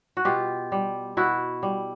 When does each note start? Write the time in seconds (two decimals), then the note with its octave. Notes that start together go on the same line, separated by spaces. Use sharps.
0.17 F#4
0.25 B2 F4 G4
0.72 G3
1.17 B2 E4 F#4
1.63 G3